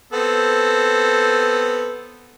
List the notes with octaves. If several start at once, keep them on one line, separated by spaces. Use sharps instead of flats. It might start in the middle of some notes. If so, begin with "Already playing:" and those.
B3 C4 A4